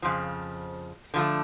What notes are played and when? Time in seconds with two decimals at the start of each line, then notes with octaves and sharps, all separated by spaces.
0.02 F2 C#3 F3
1.14 D3 F3 A3